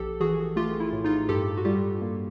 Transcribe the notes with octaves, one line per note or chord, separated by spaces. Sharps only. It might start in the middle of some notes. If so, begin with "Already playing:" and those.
Already playing: A#1 G4 A4
E3 F#4 G#4
A3 F4 G4
E4
A2
D#4 F4
G2 G4 A4
F#4
G3 F4 G4
A#3